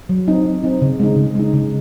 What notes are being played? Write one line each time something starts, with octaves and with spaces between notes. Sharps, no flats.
F#3
C4 D#4
F#3
C4 D#4
C#3
G#3 D#4
C#3
G#3 D#4
C#3